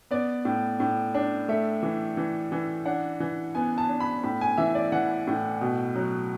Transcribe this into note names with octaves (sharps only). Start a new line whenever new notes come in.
B3 D5
A2
A2
D4
A3 E5
E3
E3
E3
D4 F#5
E3
B3 G#5
A5
D4
B5
A2 B5
G#5
E3 E5
D5
E3 F#5
A2
B2
F#3